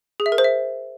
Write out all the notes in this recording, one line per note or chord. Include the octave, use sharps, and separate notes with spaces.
G#4
E5
A#4
C5
E5